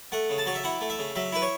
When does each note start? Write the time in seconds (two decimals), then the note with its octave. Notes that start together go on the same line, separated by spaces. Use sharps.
0.12 A3 F#5
0.30 C#3
0.38 A5
0.46 F#3 C#5
0.55 E5
0.64 E4 F#5
0.81 A3
0.90 E5
0.99 C#3
1.16 F#3 E5
1.32 E4 B4
1.42 C#5